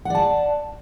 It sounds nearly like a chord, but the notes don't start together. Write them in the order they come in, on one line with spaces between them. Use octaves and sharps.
F#5 D5 A5